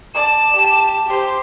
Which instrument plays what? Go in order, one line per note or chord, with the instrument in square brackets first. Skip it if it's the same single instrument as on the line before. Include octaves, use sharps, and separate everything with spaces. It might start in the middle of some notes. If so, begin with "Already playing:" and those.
[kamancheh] D5 A5 [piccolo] E7
[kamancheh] G4 A5
G4 C5